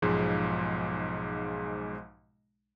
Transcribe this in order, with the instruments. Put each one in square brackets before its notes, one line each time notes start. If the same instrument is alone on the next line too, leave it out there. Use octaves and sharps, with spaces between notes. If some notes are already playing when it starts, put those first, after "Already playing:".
[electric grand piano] B1 G#2 F3 G#3